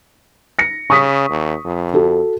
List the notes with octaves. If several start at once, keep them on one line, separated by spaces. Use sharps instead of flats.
A#6 C#7
C#3 C#6 D#6 B6
D#2
F2
F#4 A4